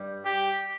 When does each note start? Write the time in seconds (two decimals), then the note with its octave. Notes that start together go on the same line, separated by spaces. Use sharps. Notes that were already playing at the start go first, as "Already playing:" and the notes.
Already playing: G2 G3
0.25 G4